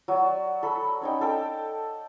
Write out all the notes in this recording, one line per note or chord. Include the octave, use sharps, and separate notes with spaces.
F#3 D5
A4 B5
C#4 D#4 G5
A4 G5 D6